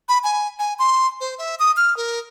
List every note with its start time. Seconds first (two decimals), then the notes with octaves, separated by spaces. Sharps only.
0.09 B5
0.23 G#5
0.59 G#5
0.79 C6
1.20 C5
1.38 E5
1.59 D#6
1.77 F6
1.97 A#4